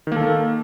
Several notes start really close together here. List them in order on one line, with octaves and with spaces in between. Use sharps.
D#3 A#3 A4